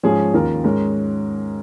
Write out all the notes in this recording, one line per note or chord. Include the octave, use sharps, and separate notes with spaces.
G#2 F3 C#4 G#4
D#2 D#3 C#4 F4 A#4
G#2 G#3 C#4 A#4